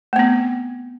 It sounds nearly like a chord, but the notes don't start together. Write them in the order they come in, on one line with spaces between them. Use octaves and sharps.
A3 B3 C4